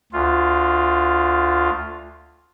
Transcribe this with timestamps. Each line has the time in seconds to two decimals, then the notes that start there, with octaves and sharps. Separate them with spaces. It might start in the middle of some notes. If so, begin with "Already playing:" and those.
0.13 D2 F4